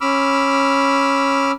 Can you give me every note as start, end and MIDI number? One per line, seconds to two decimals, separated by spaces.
0.01 1.52 61
0.01 1.52 83
0.01 1.52 86
0.01 1.52 88
0.01 1.52 89